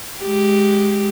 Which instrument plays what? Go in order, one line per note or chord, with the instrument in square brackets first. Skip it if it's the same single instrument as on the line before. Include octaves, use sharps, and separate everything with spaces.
[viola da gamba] G#3 G4